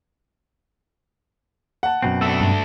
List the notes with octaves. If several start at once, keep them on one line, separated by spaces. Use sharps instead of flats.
F#5 A5
F#2 B2 C4
A3 D4 E6
G2